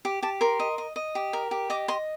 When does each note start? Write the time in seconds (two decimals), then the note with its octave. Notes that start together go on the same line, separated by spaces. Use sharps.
0.05 G4
0.22 G4 A5
0.41 A#4 C6
0.59 D#5
0.78 D#5
0.96 D#5
1.15 G4
1.33 A#4
1.51 G4
1.70 D#5 D6
1.88 D#5 C6